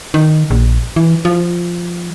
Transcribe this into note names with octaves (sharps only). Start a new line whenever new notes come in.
D#3
A#1
E3
F3